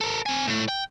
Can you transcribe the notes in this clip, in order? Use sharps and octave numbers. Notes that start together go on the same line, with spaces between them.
A4 A#4
C4 G#5
A2 A3
G5